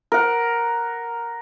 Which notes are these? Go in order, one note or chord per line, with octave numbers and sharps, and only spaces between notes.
A#4 F#5